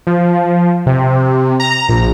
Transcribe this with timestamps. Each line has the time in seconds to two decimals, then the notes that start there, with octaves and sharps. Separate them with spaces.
0.07 F3
0.86 C3
1.60 A#5
1.89 A#1